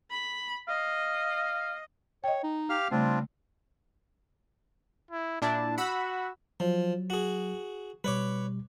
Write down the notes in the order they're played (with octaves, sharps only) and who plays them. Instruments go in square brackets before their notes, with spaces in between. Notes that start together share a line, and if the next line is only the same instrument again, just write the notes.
[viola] B5
[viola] D#5 [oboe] F5
[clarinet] C#5 [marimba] D#5 G5
[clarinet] D#4
[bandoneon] G4 F5 F6
[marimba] C#3 A3 [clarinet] G3 [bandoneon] C4 D4 F4
[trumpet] E4
[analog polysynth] A#2 D4 E4 [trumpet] A5
[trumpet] F#4 [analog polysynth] F#5 B5 E6
[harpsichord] F3 [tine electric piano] F#3
[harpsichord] F#4 G#4
[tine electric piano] B2 G3 [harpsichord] B4 C#5 D6